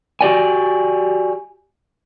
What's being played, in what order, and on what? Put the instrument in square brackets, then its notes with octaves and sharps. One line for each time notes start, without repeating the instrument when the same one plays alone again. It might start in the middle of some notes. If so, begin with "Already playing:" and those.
[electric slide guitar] F#4 G4 D5 G#5